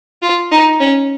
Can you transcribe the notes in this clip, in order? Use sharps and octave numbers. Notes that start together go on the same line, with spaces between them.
F4
D#4
C#4